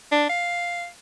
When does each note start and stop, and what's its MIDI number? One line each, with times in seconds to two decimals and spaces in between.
0.12 0.26 62
0.29 0.87 77